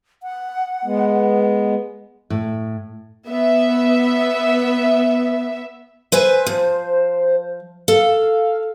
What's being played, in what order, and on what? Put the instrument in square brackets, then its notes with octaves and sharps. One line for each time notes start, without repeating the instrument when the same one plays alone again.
[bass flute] F#5
[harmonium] G#3 B3
[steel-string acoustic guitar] A2
[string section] B3 E5
[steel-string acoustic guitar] B4 E5 G#5 [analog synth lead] C5
[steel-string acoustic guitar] F3
[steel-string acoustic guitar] A4 [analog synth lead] F5